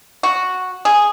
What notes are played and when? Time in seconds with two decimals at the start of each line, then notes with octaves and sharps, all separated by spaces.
0.23 F#4
0.85 G#4